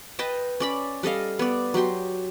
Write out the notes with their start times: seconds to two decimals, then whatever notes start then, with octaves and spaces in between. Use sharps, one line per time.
0.19 B4 D#5 G5 A5
0.60 C#4 D5 B5
1.03 G3 A4 D#5 F5
1.39 B3 D5
1.74 F#3 G4 G5 C6